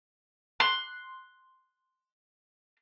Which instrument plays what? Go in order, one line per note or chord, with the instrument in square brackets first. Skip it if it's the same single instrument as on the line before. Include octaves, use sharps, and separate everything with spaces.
[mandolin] C6 F#6